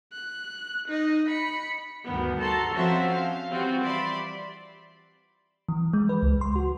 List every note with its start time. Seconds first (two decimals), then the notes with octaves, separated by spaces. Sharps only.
0.13 F#6
0.88 D#4 D#5
1.28 B5 C#7
2.05 D2 G2 D#3 B3
2.40 F#4 A4 A5 A#5 C6
2.74 F3 C4 C#4 F#4 C5 E5
3.10 F5
3.50 E3 G3 C4 F4 F#4
3.83 D5 E5 B5 C6
5.68 E3
5.93 G#3
6.09 B4
6.22 C#2
6.41 C6
6.56 F#4